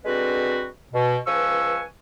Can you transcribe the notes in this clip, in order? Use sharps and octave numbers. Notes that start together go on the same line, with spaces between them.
D3 G#3 C4 F#4 B4
B2
C#2 F3 B4 G#5 C#6 E6